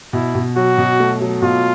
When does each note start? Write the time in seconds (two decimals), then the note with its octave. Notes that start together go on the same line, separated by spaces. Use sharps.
0.13 B2 E4
0.35 B2
0.56 F#3 F#4
0.78 B2
1.00 A3
1.21 F#3
1.42 B2 F4